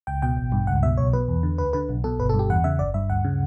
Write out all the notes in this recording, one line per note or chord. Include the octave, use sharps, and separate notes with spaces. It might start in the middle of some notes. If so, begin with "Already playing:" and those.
C#2 G5
B2 G5
A1
G2
C#2 F#5
B2 E5
B1 C#5
B2 B4
E2
D3
D2 B4
D3 B4
B1
B2 A4
G1 B4
A4
G2
G4
E2 F#5
C#3 E5
G1 D5
G2 E5
D2 F#5
C#3